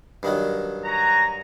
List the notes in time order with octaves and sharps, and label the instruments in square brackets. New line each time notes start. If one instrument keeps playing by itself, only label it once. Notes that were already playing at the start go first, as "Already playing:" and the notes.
[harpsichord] G2 D#3 F#3
[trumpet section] F#4 G#5 A#5